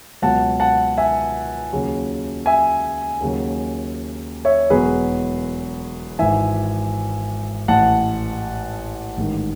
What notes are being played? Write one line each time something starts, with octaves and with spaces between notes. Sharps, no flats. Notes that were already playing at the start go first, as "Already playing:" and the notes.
C#2 B2 F#3 F#5 A5
F#5 A5
E5 G#5
D#2 C#3 F#3
E5 G#5
D#2 C#3 F#3
C#5 E5
E1 E2 B2 F#3 G#4 B4
G#1 G#2 E3 E5 G#5
A1 A2 E3 F#5 A5
A1 G#2 D#3